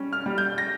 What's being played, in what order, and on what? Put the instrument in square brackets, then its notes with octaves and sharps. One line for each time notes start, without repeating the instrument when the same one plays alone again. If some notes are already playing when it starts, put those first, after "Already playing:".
Already playing: [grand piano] G3 C#4
F6
G3
G6
A#6